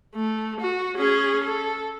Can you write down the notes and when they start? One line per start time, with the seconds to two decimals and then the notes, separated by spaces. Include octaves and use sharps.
0.15 A3
0.60 F#4
0.96 C#4 G#4
1.44 A4